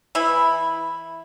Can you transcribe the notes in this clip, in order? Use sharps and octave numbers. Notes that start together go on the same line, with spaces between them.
E3 E4